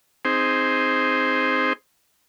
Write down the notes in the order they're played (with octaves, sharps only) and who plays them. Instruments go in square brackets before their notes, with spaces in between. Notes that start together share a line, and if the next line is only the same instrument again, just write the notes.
[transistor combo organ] C4 D#4 G#4 C5